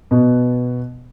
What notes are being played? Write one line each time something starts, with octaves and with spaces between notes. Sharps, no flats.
B2 B3